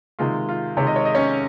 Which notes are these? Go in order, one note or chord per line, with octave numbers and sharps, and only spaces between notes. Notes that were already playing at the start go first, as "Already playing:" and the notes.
C3 D#3 G#3 F4
F4
C3 D#3 G#3 C#5
D#5
C#5
D#5
C#4 C#5